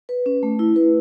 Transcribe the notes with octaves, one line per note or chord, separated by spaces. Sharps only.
B4
C#4
A3
E4
B4